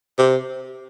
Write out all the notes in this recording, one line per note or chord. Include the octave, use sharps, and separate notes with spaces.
C3